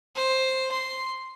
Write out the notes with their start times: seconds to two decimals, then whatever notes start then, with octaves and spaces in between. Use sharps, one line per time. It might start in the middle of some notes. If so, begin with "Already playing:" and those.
0.15 C5
0.71 C6